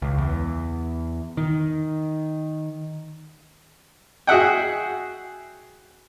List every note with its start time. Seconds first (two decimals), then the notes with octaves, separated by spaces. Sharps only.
0.02 C#2
0.18 E2
1.37 D#3
4.27 F#4 G#4 E5 F#5 G5